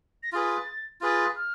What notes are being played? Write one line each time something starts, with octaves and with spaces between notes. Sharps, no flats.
A#6
F4 G#4 B4 A6
F4 G#4 B4 A6
F6